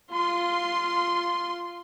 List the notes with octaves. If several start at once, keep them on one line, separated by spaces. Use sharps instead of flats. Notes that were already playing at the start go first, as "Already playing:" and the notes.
F4 C6